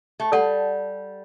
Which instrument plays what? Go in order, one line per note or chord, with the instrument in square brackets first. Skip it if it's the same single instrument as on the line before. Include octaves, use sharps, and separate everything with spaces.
[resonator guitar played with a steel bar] A3
[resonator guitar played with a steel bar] G3 [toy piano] A4 D5 F#5 A5